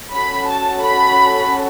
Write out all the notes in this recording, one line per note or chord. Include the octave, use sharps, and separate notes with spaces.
C#4 F#4 A4 B5
A5
B5